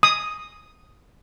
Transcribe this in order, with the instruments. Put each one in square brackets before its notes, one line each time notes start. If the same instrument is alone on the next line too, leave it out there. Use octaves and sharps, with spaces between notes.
[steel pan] D#6